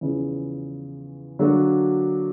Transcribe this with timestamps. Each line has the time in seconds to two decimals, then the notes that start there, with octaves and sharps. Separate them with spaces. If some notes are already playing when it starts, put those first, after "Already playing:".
0.01 E2 C#3 F3
1.39 D3 F#3 A#3 D4 F#4